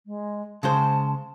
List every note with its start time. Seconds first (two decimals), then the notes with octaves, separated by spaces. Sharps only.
0.06 G#3
0.63 C#3 G#3 C5 A5